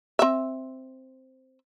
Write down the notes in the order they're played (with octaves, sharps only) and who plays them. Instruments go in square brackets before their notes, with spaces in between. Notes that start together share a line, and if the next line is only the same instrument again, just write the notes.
[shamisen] C4 E5